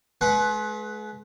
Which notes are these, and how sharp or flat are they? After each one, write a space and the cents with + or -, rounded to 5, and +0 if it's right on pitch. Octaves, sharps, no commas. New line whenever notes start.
G#3 +40 B4 +0 F#5 +5